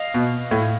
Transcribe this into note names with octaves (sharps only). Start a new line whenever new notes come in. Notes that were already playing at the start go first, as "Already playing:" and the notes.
Already playing: D#5 F5
B2
A2